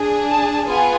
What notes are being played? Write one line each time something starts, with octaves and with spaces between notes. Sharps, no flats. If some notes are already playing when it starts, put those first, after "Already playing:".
Already playing: D4 G#4
A5
B3 F4 G#4 G#5